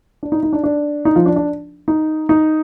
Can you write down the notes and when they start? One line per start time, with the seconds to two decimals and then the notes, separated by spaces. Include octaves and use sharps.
0.23 D4
0.32 D#4
0.43 D#4
0.53 D4
0.64 D4
1.05 D#4
1.15 F3 F4
1.26 D4
1.36 D4
1.88 D#4
2.29 D#4